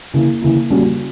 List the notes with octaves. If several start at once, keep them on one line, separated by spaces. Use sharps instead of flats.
C#3 E3 A#3 E4
C#3 E3 A#3 E4
A#2 G3 C#4 F#4